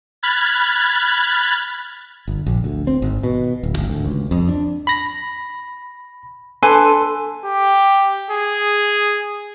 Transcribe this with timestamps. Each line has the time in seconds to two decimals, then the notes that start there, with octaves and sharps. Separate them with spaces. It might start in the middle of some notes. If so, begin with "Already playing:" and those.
0.23 B5 F6 F#6 G#6 A6
2.28 G1
2.46 A#1
2.64 D2
2.87 C4
3.02 G#1
3.23 B2
3.63 D1
3.78 G#1
3.90 D2
4.05 C#2
4.31 F2
4.49 D4
4.87 B5 A#6
6.63 D4 A4 B4 G#5 C6
7.45 G4
8.30 G#4